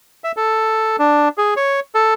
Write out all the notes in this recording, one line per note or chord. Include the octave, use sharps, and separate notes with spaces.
E5
A4
D4
G#4
C#5
A4